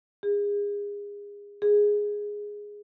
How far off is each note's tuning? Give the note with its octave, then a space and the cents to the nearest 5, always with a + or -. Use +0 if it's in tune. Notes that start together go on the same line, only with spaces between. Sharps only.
G#4 -30
G#4 -5